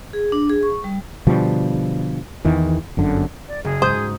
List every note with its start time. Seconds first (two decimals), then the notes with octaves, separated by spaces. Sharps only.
0.13 G#4
0.32 D4
0.49 G#4
0.63 C#6
0.84 G3
1.27 B2 D3 F3 G3
2.45 E2 D#3 E3
2.97 G1 F#2 D3
3.48 D5
3.65 F#1 G#4
3.82 G#2 C5 D#6 G6